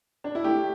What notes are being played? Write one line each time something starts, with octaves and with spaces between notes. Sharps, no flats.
D4
E4
A3 G4